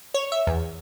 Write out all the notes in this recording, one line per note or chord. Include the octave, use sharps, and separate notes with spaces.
C#5
E5
E2